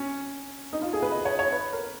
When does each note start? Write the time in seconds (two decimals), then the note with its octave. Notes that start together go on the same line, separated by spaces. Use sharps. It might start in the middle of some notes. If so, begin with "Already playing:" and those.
Already playing: C#4
0.73 D#4
0.82 F4
0.93 G#4
1.02 B4
1.12 D#5
1.25 C#5
1.39 C#5
1.52 B4
1.73 A#4